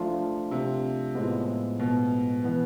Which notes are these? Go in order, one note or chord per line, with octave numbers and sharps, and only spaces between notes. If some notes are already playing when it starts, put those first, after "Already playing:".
Already playing: F3 A3 D4 F4
C3
A2 F3 G#3 B3
B2
E3 B3